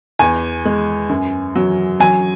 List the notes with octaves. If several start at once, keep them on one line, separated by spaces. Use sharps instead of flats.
E2 G#5
G#3
F#2
F#3
F#3 G#5